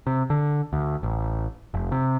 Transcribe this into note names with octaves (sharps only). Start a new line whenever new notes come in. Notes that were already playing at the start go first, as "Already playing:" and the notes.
C3
D3
D2
A1
F1
C3